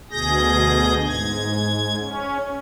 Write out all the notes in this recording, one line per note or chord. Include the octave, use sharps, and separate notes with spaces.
D2 B2 G#4 G6 A#6
G#2 G#6
C#4